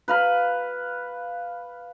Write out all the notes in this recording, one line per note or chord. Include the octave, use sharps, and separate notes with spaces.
B4 F5 B5